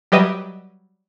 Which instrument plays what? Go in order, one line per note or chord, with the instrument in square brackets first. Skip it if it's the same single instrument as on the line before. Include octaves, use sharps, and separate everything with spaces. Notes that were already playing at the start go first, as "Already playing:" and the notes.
[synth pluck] F#3 G3 G4 B4 D#5 E5